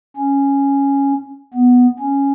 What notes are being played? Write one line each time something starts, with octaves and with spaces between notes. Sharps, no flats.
C#4
B3
C#4